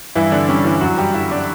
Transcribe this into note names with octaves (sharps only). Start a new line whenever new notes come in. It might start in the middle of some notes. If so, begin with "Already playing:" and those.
G2 E3 E4
D3 D4
D3 G3 C#4
E3 E4
F#2 F#3 F#4
G3 G4
D3 F#3 E4 E5
D4 D5